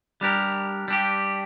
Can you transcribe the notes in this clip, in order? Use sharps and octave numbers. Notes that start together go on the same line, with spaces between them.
G3 D4 G4 A#4
G3 D4 G4